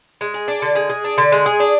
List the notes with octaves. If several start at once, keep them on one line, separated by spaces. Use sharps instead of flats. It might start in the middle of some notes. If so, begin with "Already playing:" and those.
G#3
G#4
D4
D3
G#3
G#4
D4
D3
G#3
G#4
D4